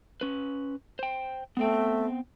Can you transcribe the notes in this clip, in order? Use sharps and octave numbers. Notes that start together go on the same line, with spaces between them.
C#4 B4
C5 G5
A3 B3 C4 G5